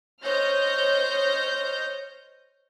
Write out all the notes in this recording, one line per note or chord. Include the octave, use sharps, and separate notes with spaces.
C5 C#5 D#5 F6 G6 A#6